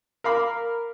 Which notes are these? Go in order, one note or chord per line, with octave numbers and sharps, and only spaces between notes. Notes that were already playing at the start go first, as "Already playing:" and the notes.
A#4 F5 B5 D6